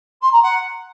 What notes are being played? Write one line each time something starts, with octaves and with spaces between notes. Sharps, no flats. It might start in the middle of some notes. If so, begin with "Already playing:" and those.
C6
A#5
F#5